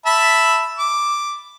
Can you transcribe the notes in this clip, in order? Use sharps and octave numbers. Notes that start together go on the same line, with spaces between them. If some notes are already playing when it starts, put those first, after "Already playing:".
E5 A5 B5
D6